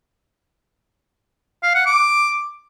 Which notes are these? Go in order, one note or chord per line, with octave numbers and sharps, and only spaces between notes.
F5
F#5
D6